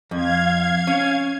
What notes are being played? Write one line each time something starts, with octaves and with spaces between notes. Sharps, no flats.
F2 F5 G#6
C#4